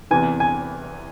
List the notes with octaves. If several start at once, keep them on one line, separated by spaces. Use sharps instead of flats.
E2 C3 E3 G#5
G#5